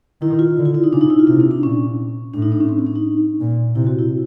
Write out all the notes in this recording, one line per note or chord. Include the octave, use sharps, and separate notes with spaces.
D#3 E4
F4
D3
F4
E4
D#4
C#3 D4
D#4
E4
F4
C3 E4
D4
D4
A#2 C#4
A2 D4
D#4
D4
C#4
C4
C#4
D4
D#4
A#2
C3 E4
F#4
E4